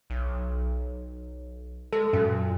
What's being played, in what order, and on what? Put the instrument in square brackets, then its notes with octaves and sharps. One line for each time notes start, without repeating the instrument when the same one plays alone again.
[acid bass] B1
[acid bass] G#3 [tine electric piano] A4
[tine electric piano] F#2 [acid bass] A#2